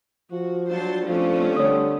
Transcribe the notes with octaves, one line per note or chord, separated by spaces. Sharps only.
F3 F#4
F#3 G3 D4 F4 C5 A5
F3 A3 C4 C#4
D3 G3 C#5 D#6